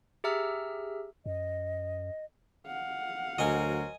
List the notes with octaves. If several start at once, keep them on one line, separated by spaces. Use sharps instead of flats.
G4 G#4 E5 A#5 E6 F6
F#2 D#5
F5 F#5
D2 F#3 A#4 C5 D#5 G#5